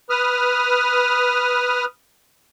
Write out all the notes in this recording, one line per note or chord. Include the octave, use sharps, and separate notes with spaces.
B4 D#6 F6